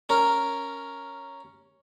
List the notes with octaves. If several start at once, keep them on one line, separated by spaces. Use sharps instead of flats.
C#4 A#4